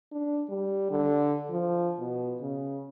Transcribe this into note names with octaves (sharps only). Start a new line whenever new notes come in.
D4
G3
D3
F3
B2
C#3